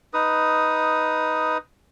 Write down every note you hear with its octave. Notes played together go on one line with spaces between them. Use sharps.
D#4 B4 D#6